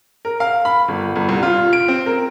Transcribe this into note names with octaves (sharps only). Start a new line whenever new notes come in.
A#4
F5
B5
G1
G1
C2
F4
D7
C4
A#4